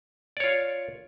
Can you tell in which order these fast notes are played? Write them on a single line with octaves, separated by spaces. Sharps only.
D5 C#5 F4